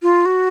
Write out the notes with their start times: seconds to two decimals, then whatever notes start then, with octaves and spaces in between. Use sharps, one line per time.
0.02 F4
0.25 F#4